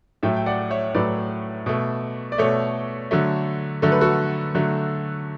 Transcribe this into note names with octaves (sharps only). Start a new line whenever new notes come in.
A2 F#3 A3 E5 G5
G5
D5 F#5
C#5 E5
A2 F#3 A3 B4 D5
B2 A3
D5
B2 A3 A4 C#5
D3 F#3 A3
D3 F#3 A3 A4
B4
F#4 A4
D3 F#3 A3